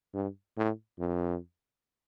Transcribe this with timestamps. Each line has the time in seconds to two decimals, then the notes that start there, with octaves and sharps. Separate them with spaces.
0.14 G2
0.57 A2
0.99 F2